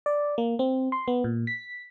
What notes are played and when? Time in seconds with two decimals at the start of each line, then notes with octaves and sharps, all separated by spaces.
0.06 D5
0.38 A#3
0.59 C4
0.92 C6
1.08 B3
1.24 A#2
1.47 B6